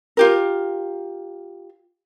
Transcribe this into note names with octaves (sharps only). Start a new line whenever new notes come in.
F4 G4 A#4